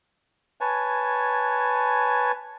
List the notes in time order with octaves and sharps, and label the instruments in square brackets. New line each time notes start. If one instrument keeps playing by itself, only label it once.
[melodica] B4 C#5 G#5 A5